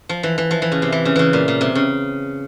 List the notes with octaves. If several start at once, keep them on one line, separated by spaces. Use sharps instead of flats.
F3
E3
E3
F3
E3
C#3
C3
E3
C#3
C#3 E3
A#2
A#2
C3
C#3